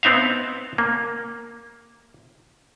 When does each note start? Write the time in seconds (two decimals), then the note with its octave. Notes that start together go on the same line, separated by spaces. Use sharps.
0.03 B3 C4 D#4 E5 F5
0.78 A#3